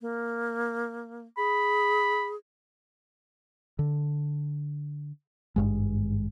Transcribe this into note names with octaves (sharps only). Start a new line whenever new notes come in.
A#3
G#4 B5
D3
G#1 G2 G#3